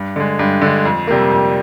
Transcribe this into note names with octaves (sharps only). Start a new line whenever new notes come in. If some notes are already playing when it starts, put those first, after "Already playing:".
Already playing: G2
D3 G#3
G2
D3 G#3
F2
C3 G3 A#3
F2